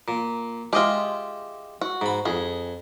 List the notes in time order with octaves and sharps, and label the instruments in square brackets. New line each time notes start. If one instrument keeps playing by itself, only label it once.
[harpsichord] A#2
[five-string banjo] G#3 F4 [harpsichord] G4 D#5 E5
[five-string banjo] F#4
[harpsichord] G#2 B5
[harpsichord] F2 [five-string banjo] G#4